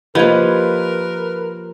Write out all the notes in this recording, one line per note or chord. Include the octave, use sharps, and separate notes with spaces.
F3 A#3 G4 A#4 B4 D#5 G#6